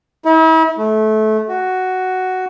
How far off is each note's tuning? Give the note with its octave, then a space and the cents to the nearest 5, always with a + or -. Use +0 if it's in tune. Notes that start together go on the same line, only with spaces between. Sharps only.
E4 -40
A3 -25
F#4 +5